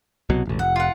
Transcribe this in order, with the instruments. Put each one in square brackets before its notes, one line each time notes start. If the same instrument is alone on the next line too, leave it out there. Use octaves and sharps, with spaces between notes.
[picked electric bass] C2 B2 F#3
E1 A1
[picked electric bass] F1 [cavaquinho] F#5
[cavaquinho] F4 F#5